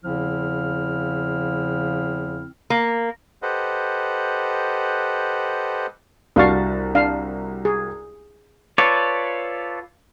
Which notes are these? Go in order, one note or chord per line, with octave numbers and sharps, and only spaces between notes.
E2 C#3 F3 C4 E4 F6
A#3
G4 A4 B4 C5 D#5 F#5
C2 D4 F#4 F5 C#6 A6
D4 F5
G#4
F4 A4 B4 C#5 D5